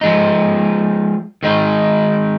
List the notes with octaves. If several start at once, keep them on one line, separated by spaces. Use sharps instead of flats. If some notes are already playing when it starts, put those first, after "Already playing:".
F3 G#3 D#4
D#3 G#3 D#4